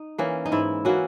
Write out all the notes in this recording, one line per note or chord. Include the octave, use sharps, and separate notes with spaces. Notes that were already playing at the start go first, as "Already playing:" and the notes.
Already playing: D#4
E3 A#3 C#4
D#4
G#2 E4
E3 A#3 C#4 F#4